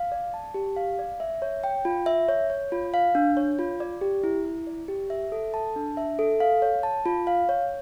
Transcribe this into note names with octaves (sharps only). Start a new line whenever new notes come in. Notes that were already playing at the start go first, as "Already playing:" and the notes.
Already playing: F5
D5
A5
G4
F5
D5
E5
C#5
G5
F4
E5
C#5
C#5
F4
F5
D4
C#5
F4
D5
G4
E4
E4
D5
G4
E5
A4
A5
D4
E5
A4
F5
C#5
A5
F4
F5
C#5